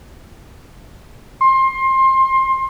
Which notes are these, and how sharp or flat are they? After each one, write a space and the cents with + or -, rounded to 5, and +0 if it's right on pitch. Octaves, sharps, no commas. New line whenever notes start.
C6 +25